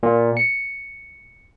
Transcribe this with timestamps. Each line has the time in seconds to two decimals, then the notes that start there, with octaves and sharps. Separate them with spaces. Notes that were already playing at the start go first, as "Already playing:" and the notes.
0.03 A#2
0.37 C#7